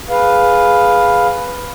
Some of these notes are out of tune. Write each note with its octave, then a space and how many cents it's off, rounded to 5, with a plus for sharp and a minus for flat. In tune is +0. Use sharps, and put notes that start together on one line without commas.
G#4 +0 B4 +0 F5 +10